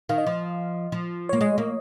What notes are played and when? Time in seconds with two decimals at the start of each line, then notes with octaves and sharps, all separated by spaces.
0.09 D#3 F5
0.18 D#5
0.26 F3
0.92 F3
1.29 A#3 C#5
1.41 G#3 D#5
1.58 A#3